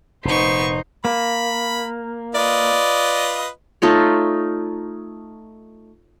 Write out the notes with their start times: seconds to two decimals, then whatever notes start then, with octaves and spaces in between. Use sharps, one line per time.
0.25 F1 A#2 B3 D#4 C5 C#6
1.05 A#3 B5
2.35 F4 B4 D5 D#5
3.82 A3 D#4 F4 C#5